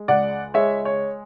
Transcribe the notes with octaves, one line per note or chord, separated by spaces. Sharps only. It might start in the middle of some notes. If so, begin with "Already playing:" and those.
Already playing: G#3
C#2 D5 F#5
G#3 C#5 E5
C#5